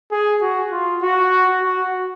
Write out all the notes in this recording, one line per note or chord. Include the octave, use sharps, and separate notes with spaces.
G#4
F#4
F4
F#4
F#4